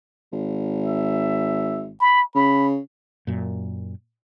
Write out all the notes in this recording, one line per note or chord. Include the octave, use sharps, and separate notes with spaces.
G#1
E5
B5
C#3 B5
F#2 A#2